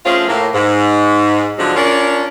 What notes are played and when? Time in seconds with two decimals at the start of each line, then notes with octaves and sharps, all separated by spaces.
0.06 F3 A3 C4 C#4 F4 G#4
0.28 A2 A#3
0.54 G#2
1.58 D3 F3 F#3 G#3 C4 D4
1.76 C#4 D4 F4 A#4 C#5 D5